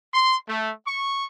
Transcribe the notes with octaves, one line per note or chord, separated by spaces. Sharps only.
C6
A3
C#6